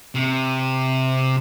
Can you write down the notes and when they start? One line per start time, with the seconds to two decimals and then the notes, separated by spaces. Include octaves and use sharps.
0.15 C3